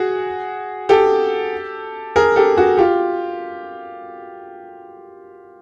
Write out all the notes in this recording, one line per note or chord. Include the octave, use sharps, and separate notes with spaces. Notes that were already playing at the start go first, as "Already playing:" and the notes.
Already playing: F#4 G#4
G4 A4
G#4 A#4
G4 A4
F#4 G#4
F4 G4